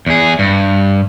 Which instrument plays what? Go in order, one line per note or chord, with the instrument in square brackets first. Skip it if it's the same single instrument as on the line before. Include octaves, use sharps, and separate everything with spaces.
[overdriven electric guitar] E2 G#4
G2